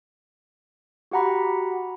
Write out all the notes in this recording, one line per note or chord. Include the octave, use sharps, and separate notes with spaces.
F#4 G4 F#5 A#5 B5